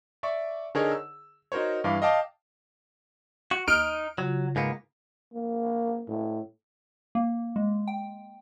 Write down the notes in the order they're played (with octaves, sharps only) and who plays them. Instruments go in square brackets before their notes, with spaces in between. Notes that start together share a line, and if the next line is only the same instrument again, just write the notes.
[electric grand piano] D5 E5 C#6 D6
D3 D#4 G#4 A#4 C#5
E6
D#4 F#4 A#4 C5 C#5
G2 E3 F5 D6
D#5 F5 G5 A5 D6
[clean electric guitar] F#4
[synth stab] D#2 F6 D7 [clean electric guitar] D#4
[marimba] C#3 F4 [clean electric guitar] F#3
[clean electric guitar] G#2 A#3 B3
[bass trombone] A#3
A2
[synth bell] A#3
G#3
G5